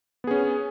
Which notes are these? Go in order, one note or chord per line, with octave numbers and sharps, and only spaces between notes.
B3 C#4 G#4